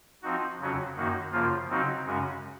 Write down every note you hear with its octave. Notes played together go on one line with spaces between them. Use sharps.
F3 C4 D#4 F#4
F2 C#3 F#3 C#4 F#4
F#2 D#3 A#3 D#4 F#4
F#2 C#3 F3 A#3 F4
C#3 F#3 C4 D#4 F#4
F#2 C#3 G#3 C#4 F#4